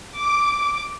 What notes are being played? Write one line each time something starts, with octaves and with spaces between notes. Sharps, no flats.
D6